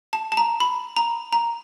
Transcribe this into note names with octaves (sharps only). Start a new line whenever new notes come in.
A5
A5
A#5
B5
A#5
A#5